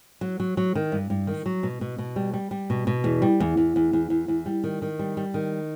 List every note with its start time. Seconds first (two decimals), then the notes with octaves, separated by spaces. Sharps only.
0.21 F#3
0.40 F#3
0.57 F#3
0.75 D#3
0.92 G2
1.10 G2
1.27 D#3
1.46 F#3
1.63 B2
1.81 B2
1.98 B2
2.16 G3
2.33 G3
2.51 G3
2.70 B2
2.87 B2
3.04 E2
3.22 G3
3.40 E2
3.57 E2
3.76 E2
3.93 E2
4.10 E2
4.28 E2
4.46 G3
4.64 D#3
4.82 D#3
4.99 G3
5.17 G3
5.34 D#3